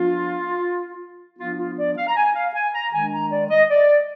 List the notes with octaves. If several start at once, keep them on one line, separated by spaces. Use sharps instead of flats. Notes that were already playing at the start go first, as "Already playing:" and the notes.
Already playing: F3 B3 D4 F4
F3 B3 D4 F4
F4
D5
F5
A#5
G#5
F5
G#5
A#5
D#3 G#3 D4 G#5
A#5
D5
D#5
D5